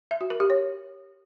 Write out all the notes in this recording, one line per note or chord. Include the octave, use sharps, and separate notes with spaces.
E5
F#4
A#4
G4
C#5